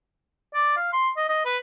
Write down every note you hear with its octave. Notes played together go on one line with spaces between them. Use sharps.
D5
F5
C6
D#5
D#5
B4